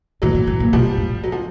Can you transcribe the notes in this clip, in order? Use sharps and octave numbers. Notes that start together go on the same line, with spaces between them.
A2 E3 F#3
A#2
A2
A#2
B2 F3 G3
A2
F#3
F3